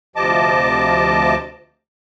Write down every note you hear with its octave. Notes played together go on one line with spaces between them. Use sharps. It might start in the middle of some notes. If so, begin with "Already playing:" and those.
D2 C3 F3 D#5 A5 D6